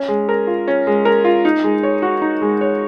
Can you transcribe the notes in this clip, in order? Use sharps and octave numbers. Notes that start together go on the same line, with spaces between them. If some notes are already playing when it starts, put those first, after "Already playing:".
Already playing: C#4
G#3
A#4
F4
C#4
G#3
A#4
F4
D#4
G#3
C#5
F#4
D#4
G#3
C#5